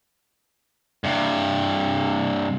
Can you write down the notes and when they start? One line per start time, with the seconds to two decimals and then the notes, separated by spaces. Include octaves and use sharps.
1.04 G2 C3